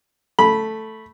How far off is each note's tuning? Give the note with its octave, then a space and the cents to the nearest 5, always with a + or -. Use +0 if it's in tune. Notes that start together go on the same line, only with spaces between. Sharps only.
A3 +0 B5 -10